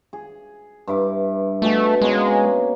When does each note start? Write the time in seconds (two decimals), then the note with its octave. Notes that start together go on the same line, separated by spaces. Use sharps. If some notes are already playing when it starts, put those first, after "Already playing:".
0.13 G#4
0.87 G2 E4 D6
1.62 B2 A3 F#4 G#4
2.02 B2 G#3 A#3 C#4